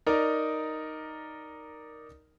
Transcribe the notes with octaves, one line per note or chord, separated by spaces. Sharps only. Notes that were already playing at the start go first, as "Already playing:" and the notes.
D#4 A#4 D5